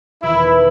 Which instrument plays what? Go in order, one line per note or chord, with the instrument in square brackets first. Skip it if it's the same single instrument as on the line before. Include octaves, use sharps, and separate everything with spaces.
[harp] E1 E2 D#3 [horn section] E4